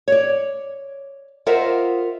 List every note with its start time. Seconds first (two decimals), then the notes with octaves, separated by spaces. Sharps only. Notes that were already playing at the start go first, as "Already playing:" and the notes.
0.08 C#5 D5
1.46 F4 A#4 C5 D#5 E5 F#5